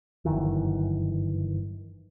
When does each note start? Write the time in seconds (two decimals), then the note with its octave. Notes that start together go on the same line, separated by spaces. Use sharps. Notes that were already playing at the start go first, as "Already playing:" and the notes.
0.25 G1 F#2 D#3 E3